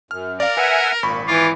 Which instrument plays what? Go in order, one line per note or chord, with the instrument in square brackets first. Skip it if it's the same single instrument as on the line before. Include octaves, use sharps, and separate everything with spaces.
[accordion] F#2 [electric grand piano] F6
[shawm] A#4 [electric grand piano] D5 F5
[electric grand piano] B4 [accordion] E5 F#5 G#5
[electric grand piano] G#1 B5 C#6 [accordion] A#2
[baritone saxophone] E3 [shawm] F4 [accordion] D6